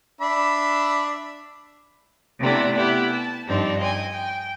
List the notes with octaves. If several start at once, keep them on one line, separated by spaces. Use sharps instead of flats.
D4 E5 B5
C3 A3 B3 D4 E4
B3 E4 G4
A5
G2 F3 C4 D4 D#4
D#5 G5 G#5
G5